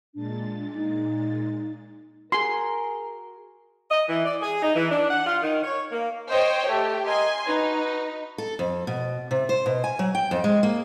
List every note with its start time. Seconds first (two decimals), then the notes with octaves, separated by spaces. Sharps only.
0.14 A#2 G#3 D4 A6
0.75 D#4
2.32 F#4 G#4 A#4 C6
3.91 D#5
4.09 E3
4.25 D5
4.41 G#4
4.62 D#4
4.76 E3
4.91 D4
5.09 F#5
5.26 F4
5.42 D#3
5.63 C#5
5.92 A#3
6.30 C5 C#5 D#5 G5
6.68 A3 G4
7.06 A#4 D#5 G#5 C6
7.47 D#4 F#4 B4
8.38 A4
8.59 F2
8.87 B2
9.31 C3
9.49 C5
9.66 B2
9.84 G#5
9.99 F#3
10.15 G5
10.31 F2
10.44 G#3
10.63 A#3